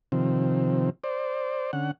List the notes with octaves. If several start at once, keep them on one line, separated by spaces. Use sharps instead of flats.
C3 D#3 F3 C4
C5 D5
D3 C#4 F#5